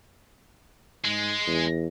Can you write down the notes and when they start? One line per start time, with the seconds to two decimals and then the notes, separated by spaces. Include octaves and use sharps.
1.04 G#2 G#3
1.46 E2